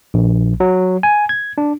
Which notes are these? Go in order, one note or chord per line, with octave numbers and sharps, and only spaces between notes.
A#1
F#3
G#5
G#6
D4